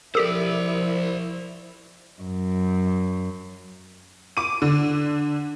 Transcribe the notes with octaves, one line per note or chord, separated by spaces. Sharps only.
F3 E4 G4 A4 A#4 C5 D5
F#2
D6 D#7
D3